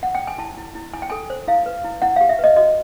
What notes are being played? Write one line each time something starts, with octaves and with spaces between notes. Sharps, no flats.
F#5
G5
G#5
E4 A5
E4
E4
E4 G#5
G5
A4 G#5
C5
E4 F5
B4
E4
E4 F#5
G4 F5
E5
B4 D#5
F#4 D#5